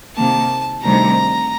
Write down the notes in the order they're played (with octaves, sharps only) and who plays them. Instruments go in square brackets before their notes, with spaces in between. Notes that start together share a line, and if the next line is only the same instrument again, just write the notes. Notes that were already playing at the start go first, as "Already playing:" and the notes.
[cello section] C3 D#3 A#3 [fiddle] A5
[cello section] D2 C3 D#3 G3 C4 [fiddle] A#5